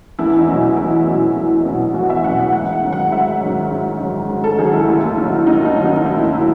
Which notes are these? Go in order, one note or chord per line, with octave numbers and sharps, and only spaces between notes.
E2 E4
D#4
B2 F#3
E4
E2 E4
B2 F#3
E2
B2 F#3
E2 F#4
E5
B2 F#3 F#5
F#5
G#2 F#5
F#5
D#3 F#3
F#5
G#2 E5
D#3 F#3
G#2
D#3 F#3
G#2
A4
D#3 F#3 G#4
E4
D#2
D#3 F#3
D#2 D#4
D#4
D#3 F#3
D#4
D#4
D#2 E4
E4
D#3 F#3